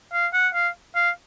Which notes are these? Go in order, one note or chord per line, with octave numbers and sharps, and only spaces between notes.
F5
F#5
F5
F5